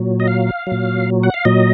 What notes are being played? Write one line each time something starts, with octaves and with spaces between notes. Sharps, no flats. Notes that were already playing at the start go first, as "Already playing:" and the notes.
Already playing: A#2 F#3
D#5
F5
A#2 F#3
F#5
F5
A#2 F#3 D#5